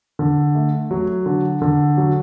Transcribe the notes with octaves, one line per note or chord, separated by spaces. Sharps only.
D3
A3
F#3
D3
D3
F#3